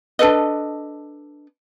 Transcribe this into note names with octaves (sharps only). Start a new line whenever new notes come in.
D4 A4 B4 D#5